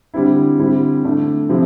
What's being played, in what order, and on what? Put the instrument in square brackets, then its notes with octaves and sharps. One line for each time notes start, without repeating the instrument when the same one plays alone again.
[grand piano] D3 G3 C4 E4
D3 G3 C4 E4
D3 A3 D4
C3 F3 C4 E4